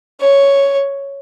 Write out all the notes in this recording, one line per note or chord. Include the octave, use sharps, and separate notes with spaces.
C#5